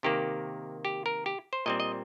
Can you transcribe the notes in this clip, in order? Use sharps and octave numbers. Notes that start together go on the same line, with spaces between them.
C3 D#3 A#3 G4
G4
A#4
G4
C5
A#2 G3 C4 D#5
D#5